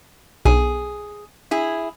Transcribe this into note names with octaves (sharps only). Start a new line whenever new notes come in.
B1 G#4
E4 G#4